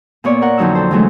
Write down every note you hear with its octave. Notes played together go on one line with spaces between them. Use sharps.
A#2 B3 C#5 D5
A#4 F#5
F2 D3 F#3 D#4 E6
A4 C5
D2 E3 F#3 G#3 A3 D4